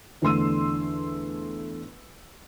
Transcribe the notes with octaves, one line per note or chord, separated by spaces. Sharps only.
E2 D3 A3 C6 E6 D#7